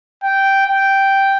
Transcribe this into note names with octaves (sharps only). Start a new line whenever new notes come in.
G5
G5